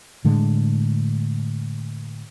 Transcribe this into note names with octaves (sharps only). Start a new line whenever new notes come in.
A2 D3 G#3